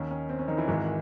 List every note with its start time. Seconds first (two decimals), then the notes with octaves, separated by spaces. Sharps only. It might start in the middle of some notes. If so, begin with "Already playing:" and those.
Already playing: D#2 D#3 C#4
0.11 C#4
0.29 C4
0.39 C#4
0.48 D#3 D#4
0.57 E3 E4
0.68 G#1 G#2 D#3